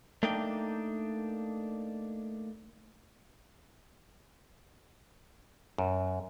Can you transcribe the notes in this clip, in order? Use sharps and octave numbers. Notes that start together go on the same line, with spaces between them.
A3 A#3 D4 D#4 G5
F#2